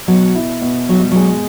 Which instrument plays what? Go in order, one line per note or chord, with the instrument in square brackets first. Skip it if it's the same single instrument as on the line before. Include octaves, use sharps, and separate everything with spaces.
[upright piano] B2 [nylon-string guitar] F#3
[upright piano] E4
B2
[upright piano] B2 [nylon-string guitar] F#3
[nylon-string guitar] G3
[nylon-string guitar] F#3 [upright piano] G#3